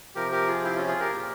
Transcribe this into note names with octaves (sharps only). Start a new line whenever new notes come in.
C3 F3 G4 A#4
G4 A#4
F4 G#4
E4 G4
C#4 F4
F4 G#4
G4 A#4
A#2 F3